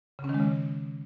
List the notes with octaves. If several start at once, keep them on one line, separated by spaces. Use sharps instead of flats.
C#3
C#4
D#3
G#3
C#3